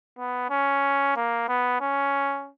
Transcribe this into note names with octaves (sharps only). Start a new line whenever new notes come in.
B3
C#4
A#3
B3
C#4